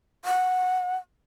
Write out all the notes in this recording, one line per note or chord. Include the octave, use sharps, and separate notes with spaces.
F#5